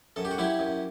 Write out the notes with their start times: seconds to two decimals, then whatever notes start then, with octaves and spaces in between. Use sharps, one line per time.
0.16 F#2 A4
0.25 G4
0.31 F#4
0.38 F#3 E4 G4
0.59 F#2